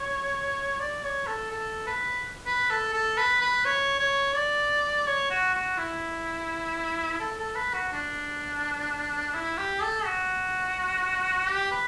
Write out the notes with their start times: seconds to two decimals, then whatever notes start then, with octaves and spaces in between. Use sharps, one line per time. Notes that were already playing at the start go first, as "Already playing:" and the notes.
Already playing: C#5
0.80 D5
1.04 C#5
1.27 A4
1.51 A4
1.87 B4
2.46 B4
2.70 A4
2.94 A4
3.18 B4
3.41 B4
3.65 C#5
4.00 C#5
4.35 D5
5.07 C#5
5.30 F#4
5.54 F#4
5.78 E4
7.20 A4
7.39 A4
7.56 B4
7.74 F#4
7.92 D4
9.35 E4
9.58 G4
9.82 A4
10.05 F#4
11.48 G4
11.71 B4